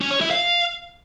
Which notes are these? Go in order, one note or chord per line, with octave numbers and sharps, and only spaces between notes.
C#4
C#5
E4
F5